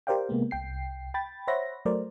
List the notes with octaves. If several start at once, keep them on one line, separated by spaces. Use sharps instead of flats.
G4 A#4 C5 D5 F5 G5
C3 G#3 A#3 B3
C2 G5 C7
G5 B5 A6
C5 C#5 E5 F#5 B5 A#6
F#3 A3 A#4 C5 D5